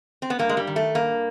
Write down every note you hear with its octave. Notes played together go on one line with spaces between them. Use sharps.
C4
B3
G2 A#3
G#3
G3
D#3
A3
G2 A#3